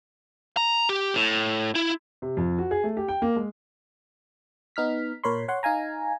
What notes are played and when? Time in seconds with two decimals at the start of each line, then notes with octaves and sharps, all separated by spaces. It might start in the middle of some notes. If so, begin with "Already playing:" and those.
0.57 A#5
0.89 G4
1.15 A2
1.75 E4
2.22 C3
2.37 F2
2.58 F#4
2.71 G#4
2.84 A3
2.97 G4
3.08 G5
3.22 A#3
3.36 G#3
4.76 B3 D#4 F6 B6
5.24 A#2 A#4 C#5 B5 C6
5.48 C#5 F#5 C6
5.63 D#4 F5 G#5 A#5